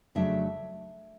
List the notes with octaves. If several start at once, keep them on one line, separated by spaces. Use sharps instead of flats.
F2 C#3 F#3 A3 D4 E5